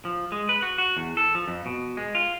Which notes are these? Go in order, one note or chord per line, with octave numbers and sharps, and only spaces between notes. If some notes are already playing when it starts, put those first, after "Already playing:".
F3
G#3
B4
F#4
F#4
E2
A4
F3
F2
B2
G#3
F4